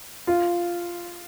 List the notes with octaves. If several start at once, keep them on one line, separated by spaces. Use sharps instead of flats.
F4